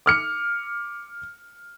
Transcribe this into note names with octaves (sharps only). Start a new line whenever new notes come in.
D6 F6 C#7